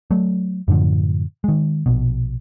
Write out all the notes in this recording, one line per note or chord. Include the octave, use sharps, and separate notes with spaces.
F#3 A3
F#2 A2 D3 F3
D#3 G#3
A#1 B2